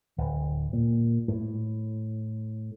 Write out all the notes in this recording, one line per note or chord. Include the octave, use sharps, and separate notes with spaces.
D1
A#2
A2